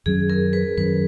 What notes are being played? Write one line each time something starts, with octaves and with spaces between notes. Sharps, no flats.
F#2 D#3 F#3 C#4 G#4
A#4
B4
F#2 D#3 F#3 C#4 B4